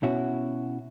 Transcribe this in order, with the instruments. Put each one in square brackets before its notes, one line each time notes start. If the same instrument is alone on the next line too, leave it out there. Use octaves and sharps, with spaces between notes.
[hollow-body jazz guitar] B2 C#4 E4 F#4